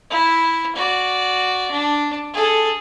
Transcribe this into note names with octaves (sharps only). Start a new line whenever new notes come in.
E4
F#4 D5
D4
G#4 A4